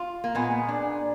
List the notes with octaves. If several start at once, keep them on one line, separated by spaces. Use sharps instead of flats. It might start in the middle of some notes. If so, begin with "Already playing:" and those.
Already playing: F4
A#3
A#2 G#3 B3
D4